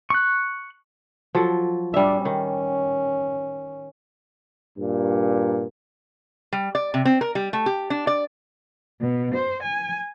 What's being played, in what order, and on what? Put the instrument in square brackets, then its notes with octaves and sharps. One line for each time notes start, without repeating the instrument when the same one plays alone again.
[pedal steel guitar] C#6 F#6
[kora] F3 F#3 A4
[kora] G3 E5 [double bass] D4
[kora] D#3 [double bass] C#4
[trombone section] G2 A#2
[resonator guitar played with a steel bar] G3
D5
C3
C4
A#4
G3
A3
G4
D4
D5
[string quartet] B2
C5
G#5